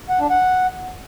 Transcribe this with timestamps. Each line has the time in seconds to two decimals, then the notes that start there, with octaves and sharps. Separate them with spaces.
0.09 F#5
0.19 D4
0.30 F#5